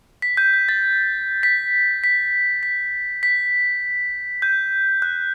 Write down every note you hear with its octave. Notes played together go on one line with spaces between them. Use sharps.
B6
G6
G6
A6
B6
B6
B6
B6
G6
F#6